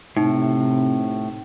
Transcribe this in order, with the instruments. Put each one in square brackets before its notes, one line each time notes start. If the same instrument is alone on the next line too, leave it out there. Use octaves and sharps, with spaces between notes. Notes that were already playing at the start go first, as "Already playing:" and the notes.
[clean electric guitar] A2 [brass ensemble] C3 [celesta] D#4